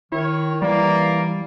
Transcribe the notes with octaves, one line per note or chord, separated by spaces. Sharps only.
D#3 E4 C#5
E3 G3 A#3 D5